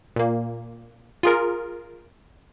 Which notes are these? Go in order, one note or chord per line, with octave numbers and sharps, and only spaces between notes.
A#2 A#3
F4 G#4 A#4